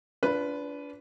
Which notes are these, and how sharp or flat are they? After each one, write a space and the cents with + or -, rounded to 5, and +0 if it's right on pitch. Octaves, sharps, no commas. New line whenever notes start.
D4 -30 F4 -20 B4 +0